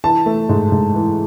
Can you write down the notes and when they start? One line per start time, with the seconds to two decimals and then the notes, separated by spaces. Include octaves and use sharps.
0.04 E3 A5
0.26 A3
0.49 G#2
0.72 G#2
0.94 E3